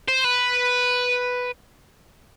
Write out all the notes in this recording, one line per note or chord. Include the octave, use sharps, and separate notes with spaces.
C5
B4